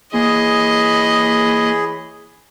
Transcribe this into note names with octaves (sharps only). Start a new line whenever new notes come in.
E3 A#3 G#4 C#5 D#5 B5